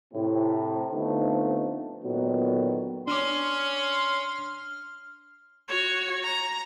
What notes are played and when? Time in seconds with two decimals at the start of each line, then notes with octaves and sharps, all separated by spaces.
0.14 A2 C3
0.93 D3 F3 A3 B3 C4 D#4
2.04 A#2 D3 D#3 F#3 B3
3.07 C#4 D4 C#5 C6 D6 F6
5.68 F#4 C#5
6.23 A#5